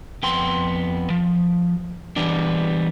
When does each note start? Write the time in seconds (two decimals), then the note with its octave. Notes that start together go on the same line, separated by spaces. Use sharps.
0.23 F2 B3 G5 C6
1.10 F3
2.16 E3 G3 B3 D4